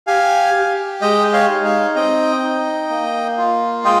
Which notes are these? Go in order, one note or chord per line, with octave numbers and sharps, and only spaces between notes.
G4 F5 G#5
G4
G#3 D#5 G5
C#5 F5
D#4
C#5 F5
C4 D#5 G5
D#4
A#3
F4
G#3 D#5 G5